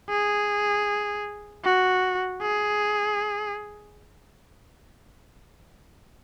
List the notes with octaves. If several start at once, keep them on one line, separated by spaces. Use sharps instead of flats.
G#4
F#4
G#4